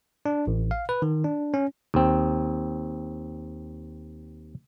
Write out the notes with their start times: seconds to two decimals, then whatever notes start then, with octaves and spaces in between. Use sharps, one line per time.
0.26 D4
0.47 A1
0.71 F5
0.89 B4
1.02 D#3
1.24 D4
1.54 C#4
1.94 D#2 C4